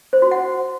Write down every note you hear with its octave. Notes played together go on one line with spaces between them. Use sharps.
C5
F#4
F#5